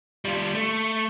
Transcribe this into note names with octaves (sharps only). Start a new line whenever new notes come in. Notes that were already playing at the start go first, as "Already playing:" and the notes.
G3 F4
A3